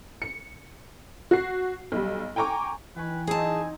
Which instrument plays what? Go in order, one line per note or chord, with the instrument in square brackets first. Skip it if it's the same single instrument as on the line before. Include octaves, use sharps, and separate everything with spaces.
[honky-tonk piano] C#7
F#4 C7
B1 G3
G5 G#5 A#5 C#6 D6
[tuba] E3 [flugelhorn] B4 [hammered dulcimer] G5 G#5 C#6
[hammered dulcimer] F#3 C4 D#4 [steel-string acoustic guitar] G#4 A5 [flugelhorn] G#5